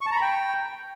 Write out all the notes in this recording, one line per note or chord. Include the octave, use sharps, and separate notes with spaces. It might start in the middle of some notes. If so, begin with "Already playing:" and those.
C#6
A5
A#5
B5
G5